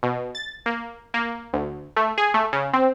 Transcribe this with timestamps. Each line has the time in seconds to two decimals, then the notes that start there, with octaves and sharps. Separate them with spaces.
0.03 B2
0.35 A6
0.66 A#3
1.14 A#3
1.53 D2
1.97 A3
2.18 G#4
2.34 A3
2.53 C#3
2.73 C4